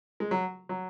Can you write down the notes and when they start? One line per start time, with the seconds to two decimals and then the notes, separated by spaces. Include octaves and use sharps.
0.20 G#3
0.31 F#3
0.69 F#3